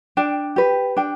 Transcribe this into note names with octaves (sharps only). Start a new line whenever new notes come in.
D4 G5
G4 B4
D4 G5